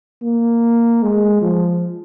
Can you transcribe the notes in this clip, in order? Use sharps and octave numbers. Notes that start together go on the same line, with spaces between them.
A#3
G#3
F3